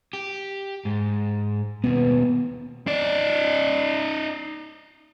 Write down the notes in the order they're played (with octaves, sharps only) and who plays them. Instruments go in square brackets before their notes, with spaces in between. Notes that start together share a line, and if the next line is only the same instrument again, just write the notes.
[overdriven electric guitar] G4
G#2
[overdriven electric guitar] D#2 B2 [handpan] B3
[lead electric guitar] D#4 D5